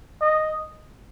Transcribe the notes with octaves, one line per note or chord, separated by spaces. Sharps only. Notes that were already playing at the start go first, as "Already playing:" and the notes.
D#5